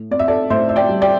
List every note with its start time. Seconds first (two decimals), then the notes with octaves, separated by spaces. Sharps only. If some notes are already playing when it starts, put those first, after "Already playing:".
Already playing: A2
0.11 C4 D5
0.19 E5
0.28 A4 D5
0.50 A2 C5 E5
0.69 E5
0.76 D5 G5
0.89 G3
1.02 D5 G5